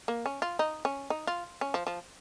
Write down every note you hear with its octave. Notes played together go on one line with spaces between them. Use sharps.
A#3
C#4
F4
D#4
C#4
D#4
F4
C#4
F3
F3